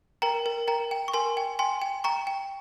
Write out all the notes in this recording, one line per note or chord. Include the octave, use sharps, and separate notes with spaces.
A#4 G5 A#5
A#4
A#4 G5 A#5
G5
C#6
A#4 G#5 C6
G5
G5 G#5 C6
G5
G5 A#5 C#6
G5